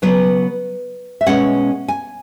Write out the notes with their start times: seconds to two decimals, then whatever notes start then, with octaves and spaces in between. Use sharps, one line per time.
0.02 C#3 F#3 B3 B4
1.21 E5
1.26 B2 G#3 C#4 F#5
1.88 G#5